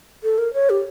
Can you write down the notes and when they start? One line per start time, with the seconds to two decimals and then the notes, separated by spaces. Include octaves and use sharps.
0.24 A4
0.38 A#4
0.54 C#5
0.70 G4